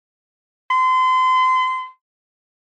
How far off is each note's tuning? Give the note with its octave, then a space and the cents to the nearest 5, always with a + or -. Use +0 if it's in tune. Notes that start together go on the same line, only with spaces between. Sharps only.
C6 -30